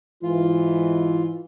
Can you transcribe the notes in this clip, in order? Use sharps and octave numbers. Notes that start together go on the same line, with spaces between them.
G#2 E3 F4